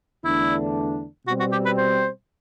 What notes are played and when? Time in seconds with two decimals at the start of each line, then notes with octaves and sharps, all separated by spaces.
0.24 E2 D3 A3 D4 E4
1.26 B2 G3 C4 F#4
1.40 F#4
1.52 G4
1.65 B4
1.77 C5